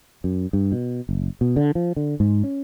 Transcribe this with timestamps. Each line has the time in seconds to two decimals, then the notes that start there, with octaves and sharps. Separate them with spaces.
0.24 F#2
0.53 G2
0.72 B2
1.09 F#1
1.41 B2
1.56 D3
1.75 F3
1.96 D3
2.20 G#2
2.44 C#4